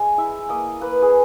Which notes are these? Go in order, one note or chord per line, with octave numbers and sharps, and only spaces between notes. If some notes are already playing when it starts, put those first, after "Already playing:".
Already playing: G#3 G#5
E4 E5
A#3 D#5
A#3 B4
G#4